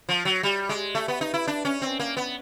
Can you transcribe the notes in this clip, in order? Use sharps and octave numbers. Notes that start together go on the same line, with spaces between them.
F3
F#3
G3
G#3
A3
B3
D#4
E4
D4
C#4
C4
A#3
B3